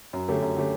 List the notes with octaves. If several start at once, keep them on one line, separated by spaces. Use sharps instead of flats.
F#2
D3 A3 C#4 G4
F#2
D3 A3 C#4 G4